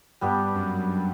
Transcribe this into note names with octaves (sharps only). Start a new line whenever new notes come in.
G2 G3 B3 D4 G4
F#2